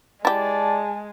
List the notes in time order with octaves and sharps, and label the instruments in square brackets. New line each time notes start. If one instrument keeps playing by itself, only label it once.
[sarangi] G#3 [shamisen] E4 G4 [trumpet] D5 [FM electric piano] A5